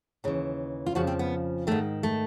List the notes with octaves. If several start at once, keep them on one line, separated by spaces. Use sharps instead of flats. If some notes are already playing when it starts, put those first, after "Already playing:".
D#2 C#3 E3
F4
F2 C#3 F3 F#4
C4
B3
G#2 D#3 A3
A3